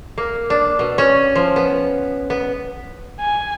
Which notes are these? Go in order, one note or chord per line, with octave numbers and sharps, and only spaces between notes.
A#3
D4
B2
C#4
F3
B3
B3
G#5